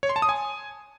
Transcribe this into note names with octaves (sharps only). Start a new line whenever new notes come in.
C#5
C6
A5
D#6
G#5